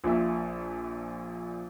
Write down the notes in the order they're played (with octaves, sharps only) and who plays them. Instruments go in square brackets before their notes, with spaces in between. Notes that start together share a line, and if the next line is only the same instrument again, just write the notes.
[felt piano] A#1 A#2 E5